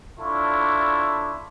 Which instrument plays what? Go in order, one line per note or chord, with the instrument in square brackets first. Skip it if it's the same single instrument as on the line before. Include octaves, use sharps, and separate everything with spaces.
[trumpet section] D4 E4 F4 A4 C#5 A5